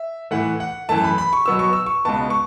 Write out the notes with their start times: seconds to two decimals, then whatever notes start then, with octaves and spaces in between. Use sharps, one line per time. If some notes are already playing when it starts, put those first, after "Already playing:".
Already playing: E5
0.31 A2 E3 A3 F#5
0.60 F#5
0.89 F#2 E3 A3 A5
1.04 B5
1.18 B5
1.33 C#6
1.46 B2 F#3 B3 E6
1.59 C#6
1.73 E6
1.86 C#6
2.05 C#2 B2 B3 A5
2.30 C#6